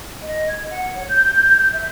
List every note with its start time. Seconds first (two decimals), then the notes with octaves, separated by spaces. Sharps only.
0.22 D#5
0.47 G#6
0.69 F#5
0.94 C#5
1.09 G6
1.71 E5